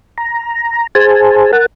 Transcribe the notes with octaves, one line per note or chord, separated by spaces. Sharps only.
A#5
G#4 C5 G#5 A5
A#4 F#5 A5